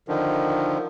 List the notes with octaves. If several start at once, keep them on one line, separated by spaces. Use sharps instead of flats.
D3 D#3 F3